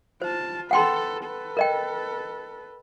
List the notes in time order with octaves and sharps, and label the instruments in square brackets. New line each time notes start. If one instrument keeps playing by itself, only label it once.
[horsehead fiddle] F4 A5 [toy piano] C5
[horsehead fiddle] A4 B4 [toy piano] F#5 G5 C6
[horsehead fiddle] A4 B4
[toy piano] A#4 D#5 G5